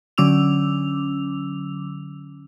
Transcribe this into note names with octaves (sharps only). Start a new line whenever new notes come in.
D3 F#3 C#4 D6 E6 F7